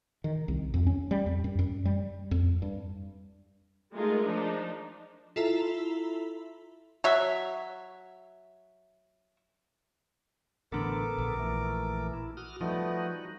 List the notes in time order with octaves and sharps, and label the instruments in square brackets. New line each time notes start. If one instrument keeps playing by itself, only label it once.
[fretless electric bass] D#3
C2
F2
C#4
G3
F2
F#2
F#2
G3
F2
G2
[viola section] G#3 A3 D#4 F4 G#4 A#4
F3 D4 D#4
[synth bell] E4 F4 A4 E5 A#5
[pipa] F#3 E5
[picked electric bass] A1 D3 [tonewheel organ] B3 A4 [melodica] A#4 D6
[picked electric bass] A#1
[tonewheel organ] E3 A3
E4
F#4 D#6 F6
[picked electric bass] F3 [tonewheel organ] G3 D#4 F#4 [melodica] A3 B3